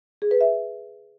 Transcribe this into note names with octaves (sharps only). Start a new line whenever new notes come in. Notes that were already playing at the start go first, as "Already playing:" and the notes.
G#4
B4
E5